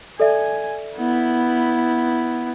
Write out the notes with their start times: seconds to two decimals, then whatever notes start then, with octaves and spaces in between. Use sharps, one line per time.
0.20 A4 D5 E5 G#5
0.96 B3 E4